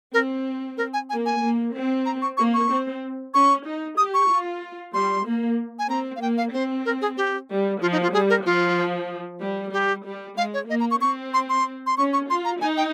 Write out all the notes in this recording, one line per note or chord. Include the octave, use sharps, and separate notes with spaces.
C4 A#4
A#4
G#5
A#3 G#5
G#5
A#3
C4
A#5
C#6
A#3 C#6
C#6
C4
C#4 C#6
D#4
G4 D#6
C#6
F4
G3 C6
A#3
G#5
C4 A#5
F5
A#3 G5
F5
C4 C5
A#4
G#4
G4
G3
F3 F4
D#4
F4
G3 G#4
A#4
F3 F4
G3
G3 G4
G3
G#3 F5
C#5
A#3 D#5
A#5
C#6
C4 C#6
C6
C6
C6
C#4 C#6
C#6
F4 C6
A#5
D#4 G#5
G5